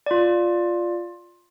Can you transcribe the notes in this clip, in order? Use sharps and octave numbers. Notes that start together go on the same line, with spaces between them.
F4 D5